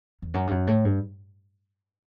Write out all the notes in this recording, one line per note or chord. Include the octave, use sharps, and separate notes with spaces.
E2
F#2
G2
F#2
A2
G2